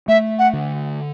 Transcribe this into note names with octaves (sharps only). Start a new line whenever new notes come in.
A3 E5
F#5
D3